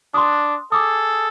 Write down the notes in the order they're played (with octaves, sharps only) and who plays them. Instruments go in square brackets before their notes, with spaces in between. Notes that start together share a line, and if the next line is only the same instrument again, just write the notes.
[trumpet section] D4 [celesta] C6 D#6
[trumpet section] G#4 A4 [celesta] D6 D#6